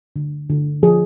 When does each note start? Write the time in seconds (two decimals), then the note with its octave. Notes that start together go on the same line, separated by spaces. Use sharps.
0.16 D3
0.50 D3
0.83 F3 G#4